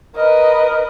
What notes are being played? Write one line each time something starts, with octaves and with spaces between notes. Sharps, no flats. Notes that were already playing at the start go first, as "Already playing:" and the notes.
A#4 B4 D#5